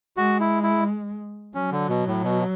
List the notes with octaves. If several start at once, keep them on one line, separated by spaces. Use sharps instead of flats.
G#3 F#4
E4
E4
F#3 C#4
D3
B2
A2
B2